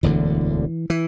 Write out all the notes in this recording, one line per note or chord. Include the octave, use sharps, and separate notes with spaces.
E1 D2 D3 E3
E3